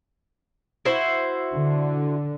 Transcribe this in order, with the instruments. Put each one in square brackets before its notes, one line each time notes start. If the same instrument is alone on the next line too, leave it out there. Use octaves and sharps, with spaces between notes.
[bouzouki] E4 F#4 C5
[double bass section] D3